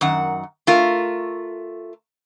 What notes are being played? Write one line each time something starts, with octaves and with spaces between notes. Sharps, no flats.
F#2 D#3 F#5
A3 F4 A#4